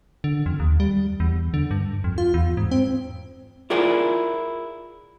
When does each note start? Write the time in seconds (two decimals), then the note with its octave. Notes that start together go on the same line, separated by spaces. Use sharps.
0.24 D3
0.46 F2
0.60 D#2
0.80 G3
1.20 E2
1.54 D3
1.71 G2
2.04 F2
2.18 F4
2.34 E2
2.57 G#2
2.71 C4
3.70 E4 F4 G#4 A#4 D5 F#5